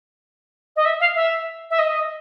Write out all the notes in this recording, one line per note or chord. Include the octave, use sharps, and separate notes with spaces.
D#5
E5
F5
E5
E5
D#5